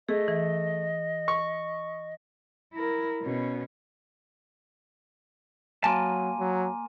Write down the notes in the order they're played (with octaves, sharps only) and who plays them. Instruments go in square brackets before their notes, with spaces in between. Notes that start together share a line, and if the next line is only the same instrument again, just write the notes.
[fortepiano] A3 [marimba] G#4 [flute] D#5
[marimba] E3
[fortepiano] C#6
[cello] E4 A#4
B2 C#4
[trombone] F#3 [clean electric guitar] A#3 A5 [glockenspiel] G#5 C6 D#7
[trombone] F#3